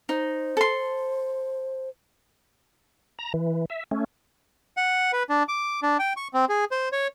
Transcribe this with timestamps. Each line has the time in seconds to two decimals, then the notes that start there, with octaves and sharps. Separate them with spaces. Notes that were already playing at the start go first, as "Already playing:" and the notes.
0.09 D#4 C5
0.57 A4 C6
3.19 A#5
3.34 E3
3.70 E5
3.91 A3 C#4
4.77 F#5
5.13 B4
5.29 D4
5.48 D6
5.83 D4
5.99 G5
6.17 C#6
6.34 C4
6.49 G#4
6.71 C5
6.92 C#5